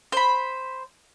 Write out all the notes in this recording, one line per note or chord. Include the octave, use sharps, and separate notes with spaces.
C5 B5